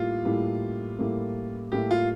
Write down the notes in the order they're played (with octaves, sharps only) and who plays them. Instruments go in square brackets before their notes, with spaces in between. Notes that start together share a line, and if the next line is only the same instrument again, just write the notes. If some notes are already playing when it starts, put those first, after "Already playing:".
Already playing: [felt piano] A2 G3 A#3 E4 [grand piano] F4
[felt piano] A2 G3 A#3 E4
A2 G3 A#3 E4
[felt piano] A2 G3 A#3 E4 [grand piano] G4
[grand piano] F4